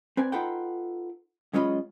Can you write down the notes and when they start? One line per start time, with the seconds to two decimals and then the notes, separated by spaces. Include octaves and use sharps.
0.17 C4 B4 D5 G#5
0.32 D#4 F4 A4 B4 F#5 G5
1.53 F#2 G#3 C#4 F4 D#5 B5